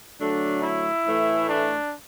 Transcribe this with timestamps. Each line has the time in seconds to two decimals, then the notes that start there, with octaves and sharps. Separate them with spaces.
0.20 D3 F#3 A3 D4
0.62 E4
1.06 A2 E3 A3
1.48 D4